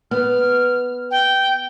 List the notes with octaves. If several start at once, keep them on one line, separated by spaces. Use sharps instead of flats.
B3 F6
G5